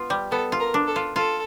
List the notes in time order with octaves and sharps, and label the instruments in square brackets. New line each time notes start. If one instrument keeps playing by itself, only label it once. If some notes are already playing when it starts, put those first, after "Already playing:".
Already playing: [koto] B3 F4
G3
[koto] B3 [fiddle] A4
[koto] F4
[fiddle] A#4
[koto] D4
[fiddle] A4
[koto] F4
[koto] F4 [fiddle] A4